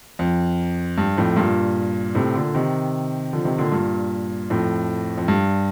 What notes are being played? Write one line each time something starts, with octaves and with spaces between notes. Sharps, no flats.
F2
G2
F2 A2
G2 A#2
A2 C3
A#2 D3
C3 D#3
D3 F3
C3 D#3
A#2 D3
G2 A#2
F2 A2
F2
G2